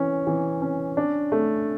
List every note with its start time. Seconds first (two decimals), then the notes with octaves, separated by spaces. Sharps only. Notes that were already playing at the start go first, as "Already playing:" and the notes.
Already playing: E3 C#4
0.27 E3
0.62 C#4
0.97 D4
1.32 A3